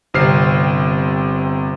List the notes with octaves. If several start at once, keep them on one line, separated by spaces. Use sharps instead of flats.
G1 C3 C4 F6 C7